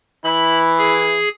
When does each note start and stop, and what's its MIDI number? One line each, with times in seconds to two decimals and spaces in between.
0.25 1.23 52
0.25 0.98 64
0.25 0.59 83
0.78 1.29 68